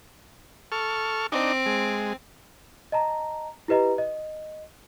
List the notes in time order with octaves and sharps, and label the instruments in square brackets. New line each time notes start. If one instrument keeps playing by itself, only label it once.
[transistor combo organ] A4 C#6 F6
[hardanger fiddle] C4 [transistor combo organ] D4 D#4
[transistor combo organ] G#3
[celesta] D#5 A5 A#5
E4 G4 B4 D#5 A#5
D#5